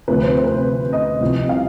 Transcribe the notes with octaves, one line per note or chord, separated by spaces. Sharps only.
D2 C3 F3 B4
C5
C5
B4
C5
D#5
C2 C3 F3
F5